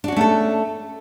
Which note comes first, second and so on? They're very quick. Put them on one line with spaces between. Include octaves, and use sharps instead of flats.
D4 F#4 C#4 A3 A4